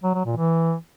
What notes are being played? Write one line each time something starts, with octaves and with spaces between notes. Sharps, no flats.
F#3
F#3
A#2
E3